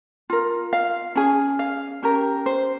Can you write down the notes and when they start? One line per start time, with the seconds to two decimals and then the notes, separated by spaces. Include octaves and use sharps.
0.30 F4 A#4
0.73 F5
1.15 C#4 G#4
1.59 F5
2.03 C#4 G4 A#4
2.46 C5